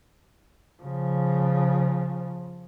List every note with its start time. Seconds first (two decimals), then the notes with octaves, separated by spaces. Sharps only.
0.83 C#3 F3